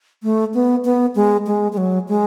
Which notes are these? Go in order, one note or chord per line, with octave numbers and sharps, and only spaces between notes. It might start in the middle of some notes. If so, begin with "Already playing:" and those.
A3
B3
B3
G#3
G#3
G#3
F#3
G#3